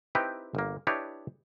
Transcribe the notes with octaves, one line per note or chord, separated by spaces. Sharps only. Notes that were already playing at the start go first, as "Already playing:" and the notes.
C4 D#4 E4 G4 B4 G5
G1 A#3
D4 E4 G4 B4 C#5 D#5